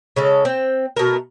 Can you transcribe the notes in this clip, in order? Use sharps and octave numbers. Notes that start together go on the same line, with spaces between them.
C#3 G#3 A4
C4 G5
B2 A3 A#4